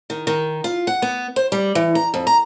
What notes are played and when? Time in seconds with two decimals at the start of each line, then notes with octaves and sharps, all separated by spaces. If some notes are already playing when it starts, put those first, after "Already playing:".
0.10 D#3
0.27 D#3
0.64 F4
0.87 F#5
1.02 B3
1.36 C5
1.52 G3
1.75 E3
1.95 A#5
2.14 F2
2.27 A#5